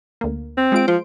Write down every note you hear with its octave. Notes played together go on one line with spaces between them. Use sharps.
D2 A#3
C4
G#3 F4 D7
F3 C5